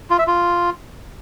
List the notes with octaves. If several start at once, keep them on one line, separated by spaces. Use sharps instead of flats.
F4
E5
F4